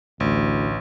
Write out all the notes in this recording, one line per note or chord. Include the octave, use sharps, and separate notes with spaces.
A1 D2